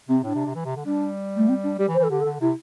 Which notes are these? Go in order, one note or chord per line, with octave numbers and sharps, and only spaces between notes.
C3 C4
A2 D4
C3
C3
E3
C3
D3
G3 D4
A3
C4
D4
G3 G4
E3
C5
E3 A4
D3 G4
A4
D3
C3 E4